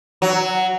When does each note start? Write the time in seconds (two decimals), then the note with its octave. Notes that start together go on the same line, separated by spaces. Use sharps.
0.22 F#3